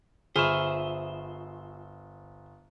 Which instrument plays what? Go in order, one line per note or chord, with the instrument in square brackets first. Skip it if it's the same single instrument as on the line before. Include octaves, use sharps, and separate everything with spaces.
[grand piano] G1 F6 [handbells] F4 B5 C#6 [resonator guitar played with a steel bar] G#4 [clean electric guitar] C5 E5